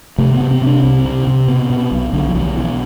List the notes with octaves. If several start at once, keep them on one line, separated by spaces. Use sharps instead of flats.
C3 A3
B3
C3
C4
C3 D4
C2 C4
C3
C3
B2
B2
B1
B1 D3
F3
B1 E3
B2 E3